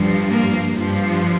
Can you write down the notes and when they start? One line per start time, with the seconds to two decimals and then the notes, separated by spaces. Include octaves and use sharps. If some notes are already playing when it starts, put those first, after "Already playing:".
Already playing: G2 F3
0.30 A#3
0.73 G2 F3